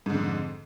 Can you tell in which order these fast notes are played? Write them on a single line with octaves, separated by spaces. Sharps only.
G#2 D3 F2